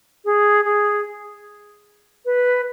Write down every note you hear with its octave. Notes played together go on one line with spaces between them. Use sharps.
G#4
G#4
B4